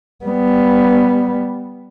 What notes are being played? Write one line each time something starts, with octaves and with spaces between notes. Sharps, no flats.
G3 B3